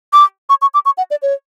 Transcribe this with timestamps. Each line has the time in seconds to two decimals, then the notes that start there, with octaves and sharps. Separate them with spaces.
0.13 D6
0.49 C#6
0.62 C#6
0.74 D6
0.85 C#6
0.98 F#5
1.11 D5
1.22 C#5